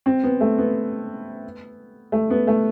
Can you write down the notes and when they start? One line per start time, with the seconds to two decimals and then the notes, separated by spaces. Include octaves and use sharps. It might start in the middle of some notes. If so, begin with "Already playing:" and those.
0.06 C4
0.24 B3
0.41 A3
0.58 B3
2.12 A3
2.30 B3
2.47 A3